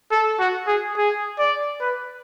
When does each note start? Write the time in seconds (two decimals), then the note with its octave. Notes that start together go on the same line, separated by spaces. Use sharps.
0.12 A4
0.40 F#4
0.67 G#4
0.97 G#4
1.39 D5
1.81 B4